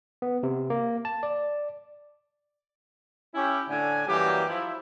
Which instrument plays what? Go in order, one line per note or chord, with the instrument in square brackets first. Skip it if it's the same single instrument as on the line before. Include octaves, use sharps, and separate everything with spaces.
[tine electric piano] B3
C3
A#3
A5
D5
[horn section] C#4 E4 G4
A2 D3 G#5
F#2 E3 F#3 G3 A#3 G4
F3 E4